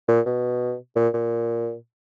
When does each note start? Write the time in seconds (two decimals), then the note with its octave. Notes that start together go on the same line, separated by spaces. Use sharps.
0.08 A#2
0.26 B2
0.96 A#2
1.14 A#2